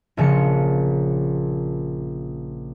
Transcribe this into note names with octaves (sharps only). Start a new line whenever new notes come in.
A#1 C#3 F3 C#7